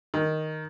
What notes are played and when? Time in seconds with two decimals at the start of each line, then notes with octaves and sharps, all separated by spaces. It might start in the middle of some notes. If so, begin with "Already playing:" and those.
0.14 D#3